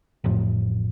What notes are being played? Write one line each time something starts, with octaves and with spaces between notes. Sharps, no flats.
A1 F2 A2